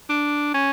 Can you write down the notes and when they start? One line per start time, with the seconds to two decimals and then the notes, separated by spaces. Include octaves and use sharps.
0.10 D4
0.54 C#4